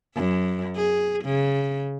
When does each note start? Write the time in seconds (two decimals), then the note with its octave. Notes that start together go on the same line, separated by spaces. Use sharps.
0.15 F#2
0.76 G#4
1.25 C#3